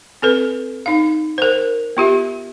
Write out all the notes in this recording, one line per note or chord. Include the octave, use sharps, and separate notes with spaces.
C4 A4 B4
D#4 F5
A#4 C5
B3 F4 G4 E5